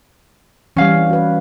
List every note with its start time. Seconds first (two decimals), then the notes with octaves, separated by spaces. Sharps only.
0.76 E3 G3 C#4 F5
1.10 F#4 B4